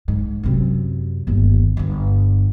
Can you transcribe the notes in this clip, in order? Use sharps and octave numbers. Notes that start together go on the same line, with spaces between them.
G#2
F#2 C3
G1 D#2
G1 G2